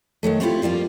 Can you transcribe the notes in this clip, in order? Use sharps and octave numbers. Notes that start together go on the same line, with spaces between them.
D#3 E3 F#3 A3
A3 C4 D4 E4 F4 G4
F3 G3 A#3 F4